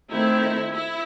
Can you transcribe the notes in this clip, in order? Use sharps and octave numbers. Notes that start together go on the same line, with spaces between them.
D#3 A3 C4 E4
E4